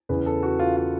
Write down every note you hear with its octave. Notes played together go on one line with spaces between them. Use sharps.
E2 C#3 E3 B4
A4
F#4
F4
F4